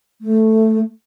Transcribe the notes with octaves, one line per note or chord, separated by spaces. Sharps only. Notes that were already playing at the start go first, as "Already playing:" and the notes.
A3